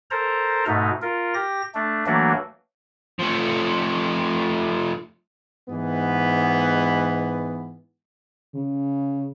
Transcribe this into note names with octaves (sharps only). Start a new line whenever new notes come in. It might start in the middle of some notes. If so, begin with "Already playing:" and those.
A4 A#4 C5 A#5
G#2 B2 A3 D#4
F4 A#4
G4 A#6
A3 D4
E3 F#3 A3 A#3 D4 F#4
F3 A3
G#2 E3 B3
C#3